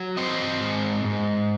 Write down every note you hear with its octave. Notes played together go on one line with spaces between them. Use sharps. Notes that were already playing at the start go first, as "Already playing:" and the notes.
Already playing: F#3
C4 C5 D#5
G#2
G#2